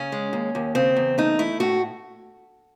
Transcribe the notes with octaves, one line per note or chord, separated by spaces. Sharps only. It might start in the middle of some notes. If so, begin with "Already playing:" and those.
Already playing: C#3 C#4
G#3
D#2
D#2
C#3 C4
E2
A3 D#4
A3 E4
A2 F#4